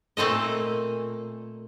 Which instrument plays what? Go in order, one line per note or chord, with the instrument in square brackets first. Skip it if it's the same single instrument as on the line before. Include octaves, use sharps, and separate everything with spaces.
[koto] A#2 A3 C4 A4 D#5